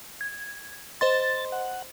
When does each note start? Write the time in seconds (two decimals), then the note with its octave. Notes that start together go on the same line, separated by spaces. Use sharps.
0.21 G#6
1.01 C5 D#5 C6 A6
1.52 F#5